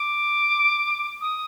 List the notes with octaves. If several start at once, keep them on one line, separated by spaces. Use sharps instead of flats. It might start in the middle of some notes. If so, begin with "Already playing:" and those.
Already playing: D6
D#6